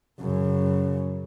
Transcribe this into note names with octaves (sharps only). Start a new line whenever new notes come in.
F#2 C#3